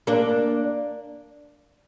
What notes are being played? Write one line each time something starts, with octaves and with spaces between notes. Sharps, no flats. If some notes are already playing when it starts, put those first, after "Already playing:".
A#3 D4